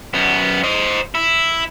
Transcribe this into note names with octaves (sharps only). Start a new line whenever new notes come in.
F#2 B3
C5 D#5
E4